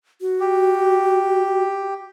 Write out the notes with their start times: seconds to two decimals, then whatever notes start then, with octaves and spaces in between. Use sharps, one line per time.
0.21 F#4
0.40 G4